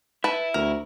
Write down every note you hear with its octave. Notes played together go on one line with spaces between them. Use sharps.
E4 B4 A5
D2 A#4